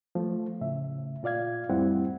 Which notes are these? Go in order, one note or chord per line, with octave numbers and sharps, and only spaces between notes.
F3 A3
A2 C#3 E5
A#2 F4 D5 F5 G#6
F2 A2 G3 C4 E4 F#5